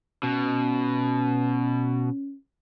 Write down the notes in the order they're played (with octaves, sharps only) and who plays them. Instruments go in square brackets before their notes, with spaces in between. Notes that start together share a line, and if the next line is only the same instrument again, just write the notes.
[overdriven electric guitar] B2 [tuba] C#4